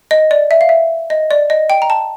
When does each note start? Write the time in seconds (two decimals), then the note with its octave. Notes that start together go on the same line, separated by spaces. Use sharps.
0.11 D#5
0.31 D5
0.51 E5
0.61 F5
0.69 E5
1.10 D#5
1.31 D5
1.50 D#5
1.70 G5
1.82 A#5
1.90 A5